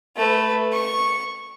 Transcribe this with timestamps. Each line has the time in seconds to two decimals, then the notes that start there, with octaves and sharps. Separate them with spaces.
0.16 A3 B4
0.72 C#6